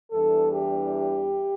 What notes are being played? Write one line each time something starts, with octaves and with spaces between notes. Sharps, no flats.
E2 E3 G3 D4 A4
G4